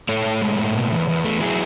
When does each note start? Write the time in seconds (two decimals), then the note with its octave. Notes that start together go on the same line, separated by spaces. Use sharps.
0.09 A2 A4 C#5
0.25 A2
0.42 G#3
0.58 A2
0.75 B2
0.92 E2
1.08 E2
1.24 A3
1.41 F#3 E4 G#4